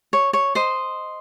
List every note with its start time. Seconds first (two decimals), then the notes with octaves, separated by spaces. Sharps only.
0.13 C#5
0.33 C#5
0.55 C5 D#5